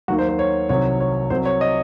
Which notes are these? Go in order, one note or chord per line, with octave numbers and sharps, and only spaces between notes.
D#2 D#3 F#3 F#4
C5
C5
C#5
C2 C3 D#3 F#3 C#5
C#5
C2 C3 F#3 C5
C#5
D#5